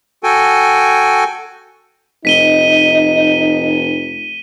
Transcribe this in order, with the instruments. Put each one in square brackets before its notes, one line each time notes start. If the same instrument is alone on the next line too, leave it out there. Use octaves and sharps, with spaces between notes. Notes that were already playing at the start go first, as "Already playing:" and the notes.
[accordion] F#4 A4 G5 G#5
[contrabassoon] F1 [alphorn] D#4 [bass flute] D#5 [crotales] B6 D#7 G7